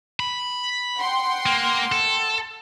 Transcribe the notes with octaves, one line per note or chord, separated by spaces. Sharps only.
B5
F#5 G5 C6
A#3
A4